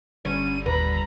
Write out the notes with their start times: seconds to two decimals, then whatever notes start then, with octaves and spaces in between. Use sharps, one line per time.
0.25 G1 D3 G3 C#4 D#7
0.66 D#1 B4 A#5 B5